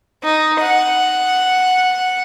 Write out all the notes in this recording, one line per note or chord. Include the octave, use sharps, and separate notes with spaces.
D#4
F#5